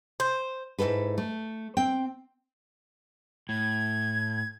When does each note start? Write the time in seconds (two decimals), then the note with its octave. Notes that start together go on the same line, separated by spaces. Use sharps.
0.20 C5
0.79 G#2 C3 E4 A4 B4
1.18 A3
1.77 C4 G5
3.49 A2 G#6